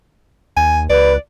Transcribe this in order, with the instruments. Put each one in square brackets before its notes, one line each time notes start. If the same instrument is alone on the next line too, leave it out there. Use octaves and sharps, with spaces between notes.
[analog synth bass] D#2 [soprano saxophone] G#5
[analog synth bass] C#2 [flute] B4 [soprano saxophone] D5